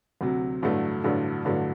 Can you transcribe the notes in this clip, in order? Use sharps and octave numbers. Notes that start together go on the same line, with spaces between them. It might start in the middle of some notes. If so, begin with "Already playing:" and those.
D2 C3 F#3
A1 G2 D3 F#3 A3
A1 G2 D3 F#3 A3
A1 G2 D3 F#3 A3